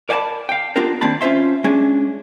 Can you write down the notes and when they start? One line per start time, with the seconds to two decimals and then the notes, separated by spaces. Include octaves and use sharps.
0.09 A#4 D5 F#5 G#5 A5 B5
0.49 F5 G5
0.76 B3 D4 F4 G4 A#4
1.01 D#2 A#3 C4 D4 A5 B5
1.21 C#4 F4 C5 E5 C6
1.64 G#3 C#4 D4 G#5